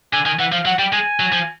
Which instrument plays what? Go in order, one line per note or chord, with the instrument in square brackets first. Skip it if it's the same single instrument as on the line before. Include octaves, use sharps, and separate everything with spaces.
[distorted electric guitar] D3 [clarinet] G#5
[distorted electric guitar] D#3 [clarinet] G#5
[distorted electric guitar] E3 [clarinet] F#5
[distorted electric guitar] F3 [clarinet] F5
[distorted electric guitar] F#3 [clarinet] F#5
[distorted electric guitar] G3 [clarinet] G5
[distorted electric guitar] G#3 [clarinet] G#5
[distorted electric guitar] F#3
F3